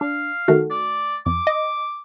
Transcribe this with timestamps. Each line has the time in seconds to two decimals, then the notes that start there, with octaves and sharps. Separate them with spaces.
0.01 D4 F5
0.48 D#3 A3 F#4
0.71 D5
1.26 F2 D6
1.47 D#5